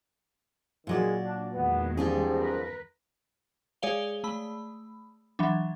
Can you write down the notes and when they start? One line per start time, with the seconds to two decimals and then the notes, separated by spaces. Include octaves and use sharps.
0.87 A#2 D#3 F#3 G#3 D5
1.23 D4
1.53 E2 D#3 G#3 B3
1.97 G#2 F3 G3 C#4 G4 G#4
2.37 A#4 B4
3.82 G#3 G#4 C#5 D5 F5 G7
4.24 A3 B5
5.39 E3 F#3 D4